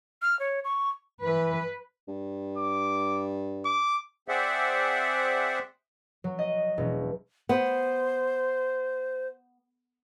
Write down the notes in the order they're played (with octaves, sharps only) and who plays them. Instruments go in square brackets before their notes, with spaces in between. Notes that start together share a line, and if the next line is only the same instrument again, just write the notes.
[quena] F6
C#5
C#6
[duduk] E3 [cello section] B4
[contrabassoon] G2
[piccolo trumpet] D6
D6
[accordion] C4 G#4 C5 D5 E5 F#5
[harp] F#3
D#5
E1
[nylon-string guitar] B3 [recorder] C5